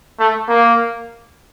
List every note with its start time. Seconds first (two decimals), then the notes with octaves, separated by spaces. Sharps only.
0.20 A3
0.48 A#3